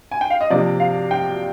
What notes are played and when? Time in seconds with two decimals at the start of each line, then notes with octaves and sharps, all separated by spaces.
0.11 G#5
0.21 G5
0.30 F5
0.41 D#5
0.50 C3 F3 A#3 D4 D5
0.80 F5
1.11 G5